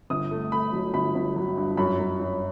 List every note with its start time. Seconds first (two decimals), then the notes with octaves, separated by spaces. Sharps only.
0.10 G1 D#6
0.31 A3
0.52 A3 B5
0.73 F#3
0.94 G1 B5
1.15 G1
1.36 F#3
1.57 G2
1.77 F#2 B5
1.99 F#2
2.20 F#2